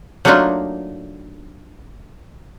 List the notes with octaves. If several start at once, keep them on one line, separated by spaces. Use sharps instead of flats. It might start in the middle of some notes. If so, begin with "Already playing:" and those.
F#3 A3 A#3 D4 D#4 F4